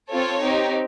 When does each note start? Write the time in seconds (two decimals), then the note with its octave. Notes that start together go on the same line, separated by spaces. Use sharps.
0.10 C4 F4 A4 C#5
0.40 C4 D#4 G4